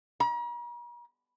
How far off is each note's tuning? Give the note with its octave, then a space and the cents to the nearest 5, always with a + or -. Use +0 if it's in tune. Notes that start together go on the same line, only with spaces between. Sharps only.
A#5 +45